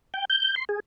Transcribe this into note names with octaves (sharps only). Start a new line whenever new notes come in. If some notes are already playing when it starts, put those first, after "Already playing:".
G5
G6
C6
G#4